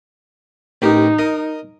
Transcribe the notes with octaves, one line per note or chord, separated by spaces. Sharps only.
A1 D#4 G4 A#4
A#4 D#5